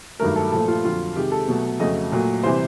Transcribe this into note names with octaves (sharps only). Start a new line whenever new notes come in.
G2 D#3 F#3 A3 A#4
A4
A#2 F3 A3 A4
F4
F2 D3 F#3 F4
C3 D#3 G#3 G4
A4
B2 F#3 A3
F2 C#3 F#3 A3 D#5
A#2 F#3 A3
C3 E3 G3 C5